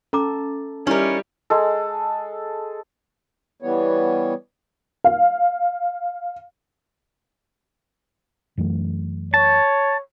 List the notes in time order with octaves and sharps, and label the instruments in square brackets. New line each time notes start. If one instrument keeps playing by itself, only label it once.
[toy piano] C#4 A#5 D6 [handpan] A4
[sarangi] G3 [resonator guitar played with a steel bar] C#4 A#4 [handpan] D#4 E4
[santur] G#3 A4
[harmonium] E3 G3 B3 C#5
[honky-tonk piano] F5
[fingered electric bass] F#2 E3 A3
[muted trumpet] C#5 [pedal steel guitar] A5